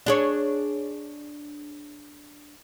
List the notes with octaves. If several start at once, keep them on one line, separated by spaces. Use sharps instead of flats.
D4 G#4 C#5